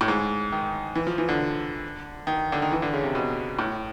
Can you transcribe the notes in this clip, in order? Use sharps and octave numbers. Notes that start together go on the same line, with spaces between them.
A2
G#2
D#3
E3
F3
E3
D3
D#3
D3
D#3
E3
D3
C#3
C3
B2
A2